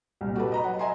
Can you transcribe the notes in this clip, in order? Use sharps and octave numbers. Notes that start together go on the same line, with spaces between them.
C2 A#2
F#4 G4 A4 B4
D#5 A#5 B5
F#3 F#5
D#5 E5 G#5 A#5 C6